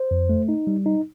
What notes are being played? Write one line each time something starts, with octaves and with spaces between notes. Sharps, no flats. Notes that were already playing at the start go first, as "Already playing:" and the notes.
Already playing: C5
F2
A3
D#4
G3
D#4